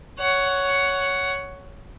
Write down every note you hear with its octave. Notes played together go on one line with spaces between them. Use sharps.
C#5 F#5